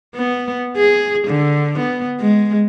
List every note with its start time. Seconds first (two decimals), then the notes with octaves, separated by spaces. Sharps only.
0.15 B3
0.76 G#4
1.27 D3
1.79 B3
2.20 G#3